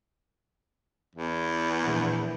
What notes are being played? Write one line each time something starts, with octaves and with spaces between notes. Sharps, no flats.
E2
A#1 A2 E3